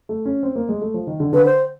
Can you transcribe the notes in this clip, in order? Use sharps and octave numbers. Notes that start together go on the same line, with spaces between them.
A3
C#4
C4
A#3
G#3
A3
F3
D#3
D3
D3 B4
C5